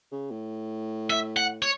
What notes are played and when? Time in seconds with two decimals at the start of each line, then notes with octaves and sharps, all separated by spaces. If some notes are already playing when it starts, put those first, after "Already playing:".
0.12 C#3
0.31 A2
1.10 E5
1.37 F#5
1.62 C#5